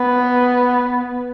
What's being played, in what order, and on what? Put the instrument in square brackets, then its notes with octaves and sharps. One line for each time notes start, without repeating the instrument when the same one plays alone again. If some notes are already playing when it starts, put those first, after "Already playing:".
Already playing: [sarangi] B3